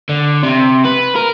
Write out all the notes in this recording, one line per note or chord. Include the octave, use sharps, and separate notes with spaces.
D3
C3
B4
A#4